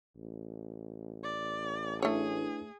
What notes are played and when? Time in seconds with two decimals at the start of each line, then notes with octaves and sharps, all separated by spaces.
0.15 A1
1.24 D5
2.02 A3 D4 E4 G#4 B4 C#5